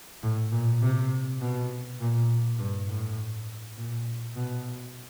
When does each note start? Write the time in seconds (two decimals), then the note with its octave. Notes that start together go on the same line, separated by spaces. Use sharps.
0.23 A2
0.52 A#2
0.82 C3
1.41 B2
2.01 A#2
2.59 G2
2.88 A2
3.77 A#2
4.36 B2